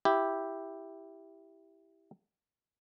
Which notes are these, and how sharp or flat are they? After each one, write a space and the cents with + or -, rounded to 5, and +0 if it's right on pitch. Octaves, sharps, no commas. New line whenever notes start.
E4 +0 G4 +0